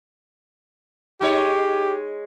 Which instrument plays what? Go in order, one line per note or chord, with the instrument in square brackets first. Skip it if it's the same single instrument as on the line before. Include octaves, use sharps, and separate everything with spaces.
[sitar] G#3 D#4 C#5 [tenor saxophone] G4